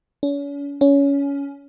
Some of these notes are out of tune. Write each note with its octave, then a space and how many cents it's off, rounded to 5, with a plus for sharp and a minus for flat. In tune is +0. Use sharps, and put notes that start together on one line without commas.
C#4 +40
C#4 +20